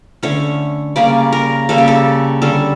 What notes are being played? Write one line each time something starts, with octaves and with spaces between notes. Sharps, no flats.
D3 A3 C#4 C#5
C#3 G3 A#3 C#4 D5
A#4
C#3 G3 A#3 C#4 A4
G4
A4
D3 G3 C#4 A4